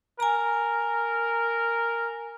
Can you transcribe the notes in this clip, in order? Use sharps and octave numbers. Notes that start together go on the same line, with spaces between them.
A#4 G#5 A#5